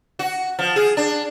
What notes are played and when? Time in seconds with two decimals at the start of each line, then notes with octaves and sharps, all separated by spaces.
0.19 F#4
0.59 F3
0.76 G#4
0.97 D4